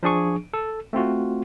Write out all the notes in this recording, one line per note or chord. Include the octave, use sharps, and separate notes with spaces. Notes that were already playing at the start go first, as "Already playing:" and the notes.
F3 D4 G#4 C#6
A4
A3 C4 F4 F#4